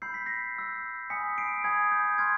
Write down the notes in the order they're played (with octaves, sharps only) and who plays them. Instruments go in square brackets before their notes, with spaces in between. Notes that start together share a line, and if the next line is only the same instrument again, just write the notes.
[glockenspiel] B5 E6 G6 C7
B6
A#6 C7
B5 E6 G6
G#5 B5 D#6 B6 C#7
C7 D7
G#5 B5 D#6 G#6
G6
C6 F6 G#6